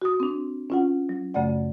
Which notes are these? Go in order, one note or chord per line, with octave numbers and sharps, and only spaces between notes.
F#4 D#6
C4 D4
C#4 F4 F#5
F#3
F#2 C#3 A3 D5 F#5